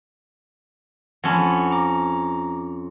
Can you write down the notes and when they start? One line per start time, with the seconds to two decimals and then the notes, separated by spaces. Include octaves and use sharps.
1.24 F2 C#4 F#5 A5 B5
1.71 A#5 D6